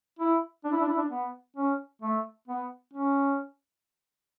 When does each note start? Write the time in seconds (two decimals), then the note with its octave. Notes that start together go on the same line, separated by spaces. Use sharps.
0.19 E4
0.64 D4
0.72 E4
0.80 D4
0.89 E4
0.97 D4
1.11 B3
1.56 C#4
2.02 A3
2.47 B3
2.93 C#4